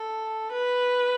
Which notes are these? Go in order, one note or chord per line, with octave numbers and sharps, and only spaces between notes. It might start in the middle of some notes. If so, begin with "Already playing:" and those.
Already playing: A4
B4